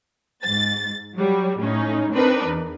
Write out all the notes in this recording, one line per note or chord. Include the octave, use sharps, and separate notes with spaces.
G#2 A6
F#3 G3
A2 C#4 D#4
C4 D4 D#4 A#4 B4
E2